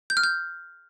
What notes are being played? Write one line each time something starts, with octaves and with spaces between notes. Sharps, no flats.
G6
F6
G6